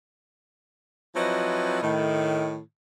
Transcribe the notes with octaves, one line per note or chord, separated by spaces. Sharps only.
F3 F#3 C4 E4 B4 D#5
A2 D#3